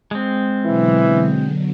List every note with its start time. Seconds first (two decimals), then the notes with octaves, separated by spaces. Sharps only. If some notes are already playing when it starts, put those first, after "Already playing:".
0.11 G#3 C4
0.65 B2 D3 E3 F#3